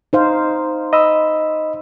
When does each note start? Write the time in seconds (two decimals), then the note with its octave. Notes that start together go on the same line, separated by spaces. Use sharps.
0.13 D#4 C5 F5
0.93 D#5 B5 E6